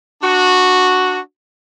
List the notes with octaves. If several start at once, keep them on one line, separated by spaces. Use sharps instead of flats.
D4 F#4